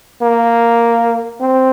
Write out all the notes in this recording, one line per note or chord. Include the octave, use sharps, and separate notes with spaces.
A#3
C4